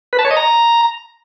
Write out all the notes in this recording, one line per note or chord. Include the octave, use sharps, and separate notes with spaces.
B4
A5
C#5
D#5
A#5